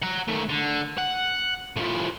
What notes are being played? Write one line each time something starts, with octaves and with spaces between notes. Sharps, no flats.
F#5 A#5
D#3 A3
D3
F#5
A2 F3